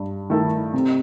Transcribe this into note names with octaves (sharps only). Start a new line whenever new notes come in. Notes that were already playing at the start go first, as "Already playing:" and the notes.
Already playing: G2
D#3 A3 E4 A4
C3